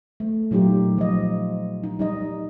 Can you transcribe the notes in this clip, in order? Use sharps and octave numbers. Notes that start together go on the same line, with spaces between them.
A3
A#2 F#3 D#4 F4 G4
F3 D#5
D#4
G3 D#4 D#5